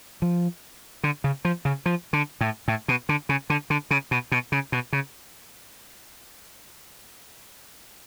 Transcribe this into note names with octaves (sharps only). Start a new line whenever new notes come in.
F3
D3
C#3
F3
C#3
F3
D3
A2
A2
B2
D3
C#3
D3
D3
C#3
B2
B2
C#3
B2
C#3